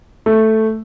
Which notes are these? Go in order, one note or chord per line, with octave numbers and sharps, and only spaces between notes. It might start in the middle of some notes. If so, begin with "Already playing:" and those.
A3